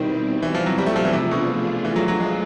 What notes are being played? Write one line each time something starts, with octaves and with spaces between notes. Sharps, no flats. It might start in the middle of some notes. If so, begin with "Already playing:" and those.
Already playing: B2 D#3 G3 C4 E4
E3
F3
F#3
G3
A3
F3
E3
C3 F3 A3 D4 F4 G#4
B2
E3
F#3
F#3
G#3